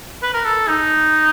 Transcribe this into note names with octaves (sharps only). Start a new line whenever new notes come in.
B4
A#4
A4
D#4